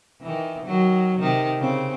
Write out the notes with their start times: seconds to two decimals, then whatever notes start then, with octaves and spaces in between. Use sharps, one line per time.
0.21 D#3 E3
0.65 D#3 F#3
1.19 C3 D#3
1.59 C#3 C4